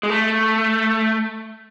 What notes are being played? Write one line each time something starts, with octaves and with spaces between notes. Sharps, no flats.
G#3
A3